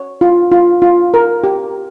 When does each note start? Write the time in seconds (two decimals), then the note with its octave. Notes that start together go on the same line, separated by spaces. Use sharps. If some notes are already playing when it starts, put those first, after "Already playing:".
Already playing: C#5
0.21 F4
0.52 F4
0.82 F4
1.14 A#4
1.44 G4